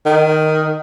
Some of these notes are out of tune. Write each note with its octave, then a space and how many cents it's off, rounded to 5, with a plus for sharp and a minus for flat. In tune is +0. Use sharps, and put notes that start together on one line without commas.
D#3 +0